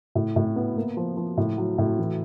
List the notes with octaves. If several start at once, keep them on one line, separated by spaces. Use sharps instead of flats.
A2
A2
B3
A#3
F3
F3
A2
F#3
A2
E3